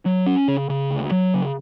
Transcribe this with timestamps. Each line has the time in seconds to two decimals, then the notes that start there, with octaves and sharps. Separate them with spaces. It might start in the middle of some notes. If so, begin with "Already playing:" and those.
0.06 F#3
0.26 C#4
0.48 C#3
0.69 C#3
0.91 D2
1.11 F#3
1.34 C#3